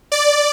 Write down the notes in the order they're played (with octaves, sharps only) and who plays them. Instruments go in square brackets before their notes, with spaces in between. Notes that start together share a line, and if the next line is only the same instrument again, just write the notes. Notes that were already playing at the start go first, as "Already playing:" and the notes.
[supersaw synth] D5